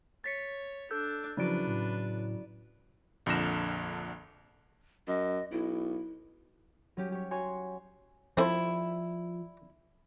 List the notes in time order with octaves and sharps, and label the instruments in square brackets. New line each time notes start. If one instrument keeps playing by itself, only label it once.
[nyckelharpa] C#5 [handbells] A6 B6 C#7
[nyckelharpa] D4 [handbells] A4 E6 G6
[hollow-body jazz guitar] C#3 F#3 [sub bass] F3 [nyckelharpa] D4 B4 [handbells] E4 D5 D7
[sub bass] A2
[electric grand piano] A#1 F2 D3 A#6 E7
[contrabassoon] F#2 [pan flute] D#5
[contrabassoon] B1 [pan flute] E4
[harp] F#3 C#4 G4
G4 C#5
F#4 C#5 G#5 C6
[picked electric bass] F3 [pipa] G3 E4 [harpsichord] C4 A4 C5